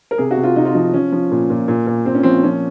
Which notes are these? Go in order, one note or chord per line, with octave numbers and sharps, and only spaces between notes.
A#4
C3 G#4
F#4
C3
F4
C3 D#4
F4
F3 D#4
F3 C#4
F3
A#2
A#2
A#2
A#2
A#2 C4
C#4
F3 C4
F3 C#4